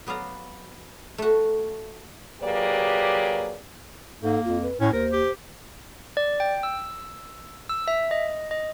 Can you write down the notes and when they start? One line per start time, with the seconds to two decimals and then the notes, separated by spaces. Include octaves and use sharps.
0.07 F#3 B3 D5 F5 A#5
1.18 A3 F#4
2.42 F#3 A#3 G4 G#4 B4 D5
4.22 G#2 A#3 A4
4.45 F2 F4
4.63 B4
4.80 A2 C#4 C#5
4.93 D#2 A#4 C5
5.12 G4
6.17 D5
6.40 G5
6.63 E6
7.69 E6
7.88 E5
8.11 D#5
8.51 D#5